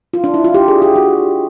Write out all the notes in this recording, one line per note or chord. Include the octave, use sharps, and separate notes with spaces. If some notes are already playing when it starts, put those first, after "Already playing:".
F4
D4
E4
F4
G4
G#4
G4
F#4